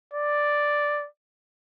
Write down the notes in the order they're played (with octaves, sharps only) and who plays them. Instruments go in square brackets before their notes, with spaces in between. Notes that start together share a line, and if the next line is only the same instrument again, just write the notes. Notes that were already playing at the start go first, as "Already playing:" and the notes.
[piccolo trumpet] D5